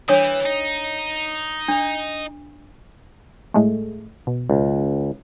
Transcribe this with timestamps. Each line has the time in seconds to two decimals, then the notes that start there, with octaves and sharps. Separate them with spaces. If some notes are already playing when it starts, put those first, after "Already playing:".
0.09 E3 D4 C#5 D#6
0.46 D#4
1.68 D4
3.54 A2 G#3 A3
4.27 B2
4.50 C#2